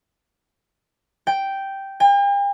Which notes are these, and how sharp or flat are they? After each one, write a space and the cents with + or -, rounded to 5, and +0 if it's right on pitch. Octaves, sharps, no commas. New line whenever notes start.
G5 -5
G5 +45